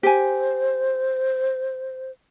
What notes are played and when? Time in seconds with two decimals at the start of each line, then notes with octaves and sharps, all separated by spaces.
0.03 G4 C5 G#5